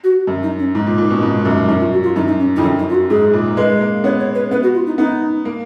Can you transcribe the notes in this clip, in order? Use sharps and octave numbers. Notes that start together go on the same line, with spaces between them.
F#4
F#2
D#4
C#4
G#2 D#4
A#2
A#2
B2
G#2
F#2
F#2 D#4
F4
F#4
F4
F#2 D#4
D#4
C#4
F2 D#4
F#2 C#4
D#4
F4
F#4
G#2 G#4
A#2
G#3 B4
A#3
B3 C#5
C#5
B4
B3 B4
F#4
F4
D#4
B3 D#4
A#3